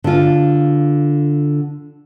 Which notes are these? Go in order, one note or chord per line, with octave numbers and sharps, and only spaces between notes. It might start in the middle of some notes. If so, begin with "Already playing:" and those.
D3 F4